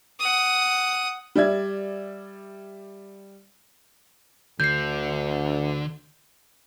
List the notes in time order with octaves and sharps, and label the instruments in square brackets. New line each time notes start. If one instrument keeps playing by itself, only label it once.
[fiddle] F#5 D#6
[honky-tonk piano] G3 D5 E5 G#6
[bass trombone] D2 [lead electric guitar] D3 [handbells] G6 C7